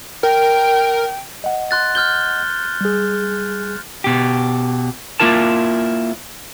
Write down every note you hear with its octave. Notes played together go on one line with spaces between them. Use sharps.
A#4 G5
D#5 F#5
C6 F#6 A6
F6 G6 G7
G3 G#4
B2 G4
A#3 C#4 E4 F4 A#4 A5